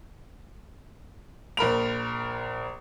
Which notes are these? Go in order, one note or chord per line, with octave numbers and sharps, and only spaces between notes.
A#1 A#4 B5 F7